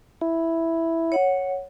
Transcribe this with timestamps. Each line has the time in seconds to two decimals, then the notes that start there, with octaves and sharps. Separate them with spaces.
0.21 E4
1.12 C#5 F#5